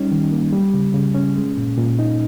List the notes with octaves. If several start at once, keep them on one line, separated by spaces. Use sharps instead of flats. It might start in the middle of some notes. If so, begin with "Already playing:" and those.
Already playing: G3 C#4 D#4
D#3
A#3
G3
C#3
C#3
C#4
G#3
A#2
A#2
D#4